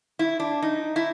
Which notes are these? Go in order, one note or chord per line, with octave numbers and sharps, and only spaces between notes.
E4
D4
D#4
E4